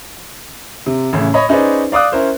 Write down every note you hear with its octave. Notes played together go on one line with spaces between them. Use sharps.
C3
A1 A2 C#3
C#5 D#5 B5
C#4 D#4 G#4 B4 C5 D5
D5 F5 D6 D#6 F#6
C#4 E4 A#4 C5